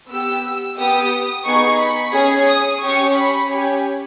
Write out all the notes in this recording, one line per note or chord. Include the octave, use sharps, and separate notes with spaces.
B3 G4 E6
B3 G4 D#6
B3 D#4 G#4 C#6
B5
C#4 G#4
D#6
C#4 G4 C#6
B5
C#4 G4 G#5